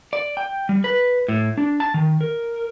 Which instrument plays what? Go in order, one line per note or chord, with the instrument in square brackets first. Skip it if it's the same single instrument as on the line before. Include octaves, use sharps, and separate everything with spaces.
[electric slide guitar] D5
G5
G3
B4
A2
D4
A5
D#3
A#4